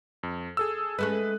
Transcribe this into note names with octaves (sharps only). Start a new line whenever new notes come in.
F2
G#4 A4 E6
G#3 A3 C#4 B4 F#6